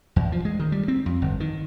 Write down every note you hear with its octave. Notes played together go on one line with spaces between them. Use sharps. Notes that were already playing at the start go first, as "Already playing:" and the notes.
E2
F3
G#3
D#3
G3
C4
F2
G1
D#3